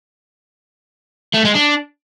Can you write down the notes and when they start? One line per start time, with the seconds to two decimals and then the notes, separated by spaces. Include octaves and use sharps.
1.34 A3
1.44 G#3
1.55 D4